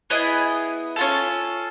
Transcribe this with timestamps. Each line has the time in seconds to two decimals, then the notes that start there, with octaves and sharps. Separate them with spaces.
0.10 B3 E4 G#4 D#5
0.96 C#4 F4 A4